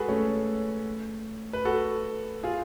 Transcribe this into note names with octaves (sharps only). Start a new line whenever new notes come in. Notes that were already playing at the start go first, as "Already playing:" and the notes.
Already playing: G#3 F#4 G#4 A4 B4
A3 C#4
B4
F#4 A4
F4 G#4